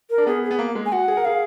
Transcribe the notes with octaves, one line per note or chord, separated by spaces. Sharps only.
A#4
D4
B3 G#4
G#4
B3
A#3
G#3
G#5
F#4 F#5
G#4
A#4
G#4 F5